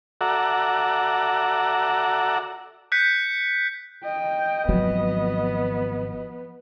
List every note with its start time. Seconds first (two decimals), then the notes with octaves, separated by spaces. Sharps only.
0.21 F#4 A4 D5 E5 F#5 A#5
2.92 F#6 G6 B6 C#7
4.05 D#5 G5
4.69 G#1 F3 F#3 B3